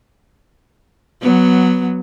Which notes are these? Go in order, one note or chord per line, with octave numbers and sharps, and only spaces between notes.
F#3 B3